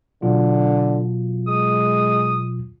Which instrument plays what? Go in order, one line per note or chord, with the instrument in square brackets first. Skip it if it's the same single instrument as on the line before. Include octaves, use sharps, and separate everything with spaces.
[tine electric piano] B2 F#3 F4 [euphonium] D3
[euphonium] G#3 [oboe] D#6